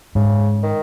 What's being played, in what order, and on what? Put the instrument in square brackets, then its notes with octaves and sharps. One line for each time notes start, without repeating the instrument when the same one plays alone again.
[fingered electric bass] G#2 [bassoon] C#3
[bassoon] D#3